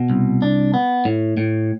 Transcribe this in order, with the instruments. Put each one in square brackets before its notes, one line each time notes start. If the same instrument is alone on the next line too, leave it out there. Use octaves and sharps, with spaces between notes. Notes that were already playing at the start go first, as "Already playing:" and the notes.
Already playing: [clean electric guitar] B2
C2
D4
B3
A2
A2